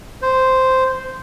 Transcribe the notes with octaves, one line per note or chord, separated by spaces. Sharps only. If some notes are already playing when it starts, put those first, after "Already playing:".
C5